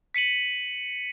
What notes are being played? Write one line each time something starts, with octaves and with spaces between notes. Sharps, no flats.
B6 C#7 D#7 F#7